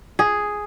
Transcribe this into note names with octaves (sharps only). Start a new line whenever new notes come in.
G#4